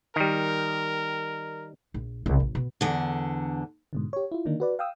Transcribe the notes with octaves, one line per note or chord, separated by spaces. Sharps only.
D#3 G3 A#4
A#1
C2 C#3
A1
B2
E2 D3
G#2 B2 D3
G4 C#5
E4 F4
D3 D#3 A#3 D4 D#4
F#4 B4 D5
F5 G5 D#6 E6